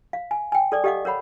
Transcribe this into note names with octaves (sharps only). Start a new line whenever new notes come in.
F5
G#5
G5 G#5
A4 D5 D6
G4 A4 D#5 F5 F#5 D6
A#4 C#5 F#5 B5